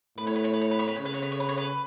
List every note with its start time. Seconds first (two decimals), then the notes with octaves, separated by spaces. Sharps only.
0.18 A2 B4
0.27 C#5
0.36 B4
0.44 C#5
0.53 B4
0.61 C#5
0.71 B4
0.79 C#5
0.88 B4
0.96 C#3 C#5
1.05 B4
1.14 C#5
1.23 B4
1.32 C#5
1.40 B4
1.49 C#5
1.57 B4